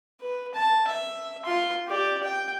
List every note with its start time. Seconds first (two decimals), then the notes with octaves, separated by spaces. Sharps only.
0.21 B4
0.54 A5
0.88 E5
1.45 F4 C6
1.88 G4 D5
2.23 G5